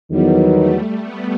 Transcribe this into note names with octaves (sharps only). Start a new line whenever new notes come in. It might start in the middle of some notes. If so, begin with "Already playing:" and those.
E2 D#3 F#3 G3 B3
A3
B3